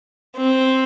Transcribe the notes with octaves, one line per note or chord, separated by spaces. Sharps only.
C4